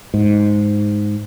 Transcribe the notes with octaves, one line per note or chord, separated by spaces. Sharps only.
G#2